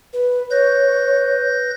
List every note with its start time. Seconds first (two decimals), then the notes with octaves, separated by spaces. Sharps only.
0.13 B4
0.51 B4 C#5 G6 A#6